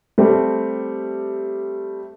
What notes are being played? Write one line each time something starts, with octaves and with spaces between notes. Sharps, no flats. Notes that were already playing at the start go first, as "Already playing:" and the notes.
G3 A3 C4 G4